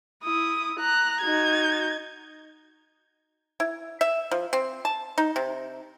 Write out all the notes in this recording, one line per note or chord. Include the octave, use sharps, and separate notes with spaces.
E4 D#6
A#5 F#6
D#4 F#4 G#6
E4
E5
F3
C4
A5
D#4
C3